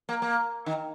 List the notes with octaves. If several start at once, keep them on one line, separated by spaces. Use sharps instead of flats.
A#3
A#3
D#3